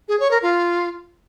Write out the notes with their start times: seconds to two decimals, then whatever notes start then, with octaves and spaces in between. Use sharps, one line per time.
0.08 G#4
0.20 C#5
0.31 A#4
0.42 F4